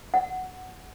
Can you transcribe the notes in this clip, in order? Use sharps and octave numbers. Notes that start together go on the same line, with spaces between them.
F#5